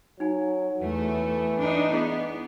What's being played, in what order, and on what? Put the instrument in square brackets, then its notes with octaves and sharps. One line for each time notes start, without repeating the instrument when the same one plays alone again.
[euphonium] F#3 [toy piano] D#4 G#5
[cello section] E2 A3 [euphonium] E3
[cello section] D4 D#4
[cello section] B3 [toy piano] E4 G#4 D#5